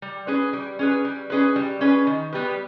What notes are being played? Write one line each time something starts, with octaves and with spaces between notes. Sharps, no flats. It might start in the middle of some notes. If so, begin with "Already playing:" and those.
G3
C#4 G#4 B4
G3
C#4 G#4 B4
G3
C#4 G#4 B4
G3
C#4 G#4 B4
D#3
G3 B3 G4 B4